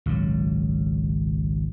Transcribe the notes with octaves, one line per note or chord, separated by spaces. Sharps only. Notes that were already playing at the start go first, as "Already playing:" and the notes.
G#1 C#2 A#2 F#3